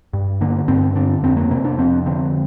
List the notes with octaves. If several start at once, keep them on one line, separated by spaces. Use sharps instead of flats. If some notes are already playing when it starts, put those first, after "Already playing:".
G2
D3 A#3
G2 C4
D3 D4
F2 C4
A#3
C3 A#3
D4
F2 C4
D3 C4